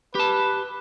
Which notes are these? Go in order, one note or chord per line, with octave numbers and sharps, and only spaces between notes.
G4 B4 A5